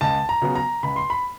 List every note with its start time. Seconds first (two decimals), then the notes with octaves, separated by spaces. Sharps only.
0.01 C#2 A5
0.29 A#5
0.42 C#3 F#3 B3
0.55 A#5
0.83 C#2 B5
0.96 C6
1.10 B5